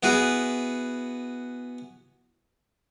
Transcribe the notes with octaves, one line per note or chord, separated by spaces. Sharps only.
B3 E4 F#4 G#4 B4